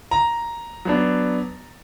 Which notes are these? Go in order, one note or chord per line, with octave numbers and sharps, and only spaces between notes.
A#5
F#3 B3 D4